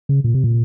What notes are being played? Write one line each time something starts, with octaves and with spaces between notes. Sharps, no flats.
C#3
A#2
C3
A#2